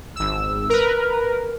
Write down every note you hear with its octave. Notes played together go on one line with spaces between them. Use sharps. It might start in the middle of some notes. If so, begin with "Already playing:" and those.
G#1 E6
A#4 B4